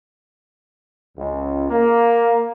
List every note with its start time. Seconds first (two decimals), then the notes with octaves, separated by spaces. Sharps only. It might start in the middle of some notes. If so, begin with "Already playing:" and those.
1.17 C#2
1.69 A#3